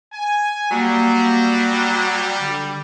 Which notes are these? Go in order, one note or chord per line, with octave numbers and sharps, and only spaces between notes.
G#5
F#3 G3 A#3
D3